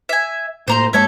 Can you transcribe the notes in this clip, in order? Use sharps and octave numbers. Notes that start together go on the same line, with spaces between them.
E5 G#5
A2 A#3 C5 A#5 C6
G2 G#3 A#3 A4 C#5 E5